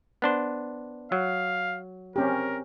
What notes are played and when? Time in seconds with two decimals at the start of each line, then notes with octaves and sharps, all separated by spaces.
0.22 B3 D4 C5
1.12 F#3 F5
2.16 C4 C#4 G4 A#4